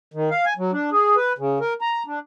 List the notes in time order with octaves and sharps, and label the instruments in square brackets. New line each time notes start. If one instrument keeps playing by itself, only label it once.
[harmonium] D#3
F5
G#5
F#3
D4
G#4
B4
C#3
A#4
A#5
D4